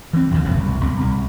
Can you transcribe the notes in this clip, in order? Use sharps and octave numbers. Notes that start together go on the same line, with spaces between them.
E3 C4
A#1 D#2 A#2 D3
D#1 A#1 F#2 C3
C2
B1
C2